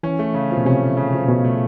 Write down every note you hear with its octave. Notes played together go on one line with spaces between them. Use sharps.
E3 C#4
A3
C#3
F3
B2
C3 C#4
A3
C#3
F3
B2 C#4
A3